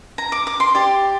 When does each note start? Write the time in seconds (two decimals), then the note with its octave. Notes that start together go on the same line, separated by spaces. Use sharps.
0.18 A#5
0.32 D6
0.47 D6
0.60 C6
0.75 G4 D5